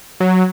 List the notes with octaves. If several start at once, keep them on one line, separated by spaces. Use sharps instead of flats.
F#3